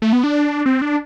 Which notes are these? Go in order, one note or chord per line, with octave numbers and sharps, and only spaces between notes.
A3
B3
D4
C4
D4